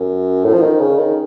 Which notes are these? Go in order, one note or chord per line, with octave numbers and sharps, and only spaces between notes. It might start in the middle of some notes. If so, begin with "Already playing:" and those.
Already playing: F#2
A2
F3
D#3
C#3
D#3